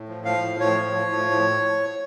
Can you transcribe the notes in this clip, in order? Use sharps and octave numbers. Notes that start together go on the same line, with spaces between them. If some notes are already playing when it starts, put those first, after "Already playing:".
Already playing: A2
F3
F3 F5
A2
A2 C#5
F3
F3
A2
A2